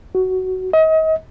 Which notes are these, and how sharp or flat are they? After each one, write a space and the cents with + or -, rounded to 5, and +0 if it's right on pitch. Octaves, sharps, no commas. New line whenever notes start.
F#4 +10
D#5 +35